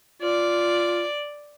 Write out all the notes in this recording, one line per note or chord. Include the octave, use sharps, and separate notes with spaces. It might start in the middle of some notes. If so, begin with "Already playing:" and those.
F4 D5